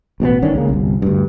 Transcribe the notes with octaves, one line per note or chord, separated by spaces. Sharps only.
A1 B2 D3 B3
G1 D#3 C#4 D4
C#2 C#3 A#3
G1 C2
D2 G2